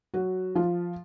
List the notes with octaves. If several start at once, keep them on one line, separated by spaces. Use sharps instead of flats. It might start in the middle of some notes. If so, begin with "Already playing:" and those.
F#3 F#4
F3 F4